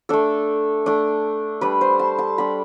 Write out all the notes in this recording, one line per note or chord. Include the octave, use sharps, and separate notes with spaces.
A3 D4 A4
A3 D4
G3 D4 B4
C5
A5
A5
G3 D4 B5